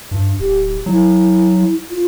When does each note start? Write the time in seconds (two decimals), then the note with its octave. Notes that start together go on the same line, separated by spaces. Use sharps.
0.11 G2
0.40 D1 G4
0.86 F#3 E4
1.90 F4